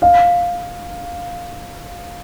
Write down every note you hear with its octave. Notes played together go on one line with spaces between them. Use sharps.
F5